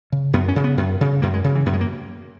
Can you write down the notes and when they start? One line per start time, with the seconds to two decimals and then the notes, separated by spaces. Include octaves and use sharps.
0.12 C#3
0.33 F#2 B3
0.48 C#4
0.56 C#3
0.64 B3
0.78 F#2
1.01 C#3
1.22 F#2 A#3
1.34 G#3
1.44 C#3
1.55 E3
1.66 F#2 B3
1.73 G#3
1.81 A#3